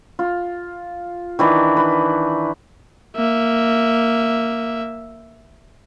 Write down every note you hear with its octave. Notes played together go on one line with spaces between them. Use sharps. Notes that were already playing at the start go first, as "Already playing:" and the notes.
F4
D#3 E3 D4
B4
A#3 E5